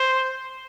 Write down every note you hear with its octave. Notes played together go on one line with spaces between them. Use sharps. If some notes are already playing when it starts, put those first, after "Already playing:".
Already playing: C5